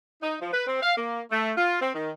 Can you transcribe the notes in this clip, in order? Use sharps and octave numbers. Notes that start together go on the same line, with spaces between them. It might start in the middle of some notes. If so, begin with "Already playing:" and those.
D#4
F3
B4
C4
F5
A#3
A3
F4
C4
D#3